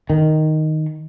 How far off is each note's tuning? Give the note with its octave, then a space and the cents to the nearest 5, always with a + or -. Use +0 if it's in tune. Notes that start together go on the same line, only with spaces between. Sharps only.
D#3 +0